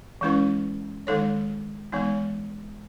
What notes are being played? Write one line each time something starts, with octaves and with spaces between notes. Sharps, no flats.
E3 G#3 C#4 E4 B4
D#3 G#3 D#4 A4 C#5
E3 G#3 B3 D#4